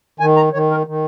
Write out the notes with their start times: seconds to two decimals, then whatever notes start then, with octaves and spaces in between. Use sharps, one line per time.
0.20 D#3 G#5
0.36 A#5
0.53 D#3 C#5
0.71 A#4
0.87 D#3